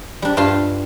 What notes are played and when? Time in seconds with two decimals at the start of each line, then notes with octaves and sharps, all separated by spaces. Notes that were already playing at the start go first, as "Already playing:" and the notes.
0.22 G3 D4
0.37 G2 F4 G4 A5 C6